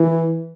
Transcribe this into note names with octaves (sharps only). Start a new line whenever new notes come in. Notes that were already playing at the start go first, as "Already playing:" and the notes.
Already playing: E3